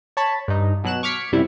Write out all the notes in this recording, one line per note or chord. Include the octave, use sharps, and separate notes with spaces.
C#5 A5 B5 C#6
G2 D#4
B2 F#3 F#6 E7
C#6 D6 F6 G#6 B6 C#7
F#2 C3 G3 E4